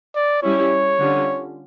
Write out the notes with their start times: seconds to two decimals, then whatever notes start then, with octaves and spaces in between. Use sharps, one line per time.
0.15 D5
0.43 G3 C#4 E4 C#5
0.99 D3 G3 C#4 F4